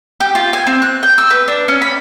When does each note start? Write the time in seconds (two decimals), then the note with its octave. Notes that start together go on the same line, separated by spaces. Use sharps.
0.20 G4
0.35 F4
0.53 G#5
0.67 C4
0.82 F#6
1.03 G5
1.18 E6
1.30 B4
1.48 D4
1.68 C#4
1.82 B5